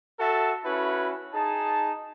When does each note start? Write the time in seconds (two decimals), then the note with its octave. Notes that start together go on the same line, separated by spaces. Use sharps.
0.20 F#4 A4 E5 A5
0.65 C#4 E4 F#4 B4
1.34 D#4 G#4 A5